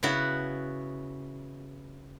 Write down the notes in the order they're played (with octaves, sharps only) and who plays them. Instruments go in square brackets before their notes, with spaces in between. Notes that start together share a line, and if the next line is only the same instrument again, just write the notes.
[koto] C#3 B3 E4 F#4